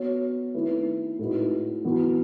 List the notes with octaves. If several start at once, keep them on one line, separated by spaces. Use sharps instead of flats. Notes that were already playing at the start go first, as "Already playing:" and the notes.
Already playing: B3 F#4 C#5
D#3 A3 E4 B4
A2 G#3 D#4 F#4 B4
E3 B3 F#4